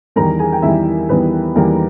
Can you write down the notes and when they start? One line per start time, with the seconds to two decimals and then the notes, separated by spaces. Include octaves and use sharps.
0.16 E2 D#3 G3 A#4 A#5
0.39 G#4 G#5
0.53 G5
0.62 E2 D#3 G3 E4 E5
1.09 E2 D#3 G3 B3 B4
1.55 E2 D#3 G3 A#3 A#4